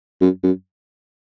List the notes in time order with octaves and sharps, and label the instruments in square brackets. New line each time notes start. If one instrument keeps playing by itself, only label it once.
[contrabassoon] F#2
F#2